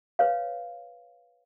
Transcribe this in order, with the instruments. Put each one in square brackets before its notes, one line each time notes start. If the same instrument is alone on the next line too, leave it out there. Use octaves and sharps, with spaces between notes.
[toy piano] B4 C#5 F5